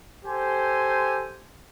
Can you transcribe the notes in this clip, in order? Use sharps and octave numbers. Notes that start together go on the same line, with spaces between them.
G4 A4 C5 G#5 C6